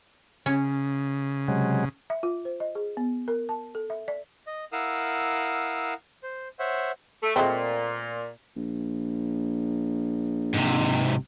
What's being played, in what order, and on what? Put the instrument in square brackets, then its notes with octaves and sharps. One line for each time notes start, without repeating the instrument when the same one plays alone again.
[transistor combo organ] C#3 [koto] C#4
[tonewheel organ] C3 F#3 G#3
[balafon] E5
F4
C5
D#5
G#4
B3
A#4
A5
A4
E5
D5
[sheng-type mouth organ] D#5
E4 A#4 F5 F#5 D#6 E6
C5
C5 C#5 E5 F#5
[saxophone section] A3
[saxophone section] A#2 [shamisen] G#3 A3 C4
[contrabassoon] A#1
[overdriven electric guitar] G#2 C3